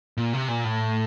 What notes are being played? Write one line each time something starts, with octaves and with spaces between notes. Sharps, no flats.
A#2
C3
A#2
A2